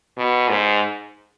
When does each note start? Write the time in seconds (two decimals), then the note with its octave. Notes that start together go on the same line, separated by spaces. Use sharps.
0.17 B2
0.49 G#2